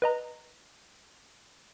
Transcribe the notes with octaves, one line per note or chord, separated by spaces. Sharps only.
B4 D#5 A#5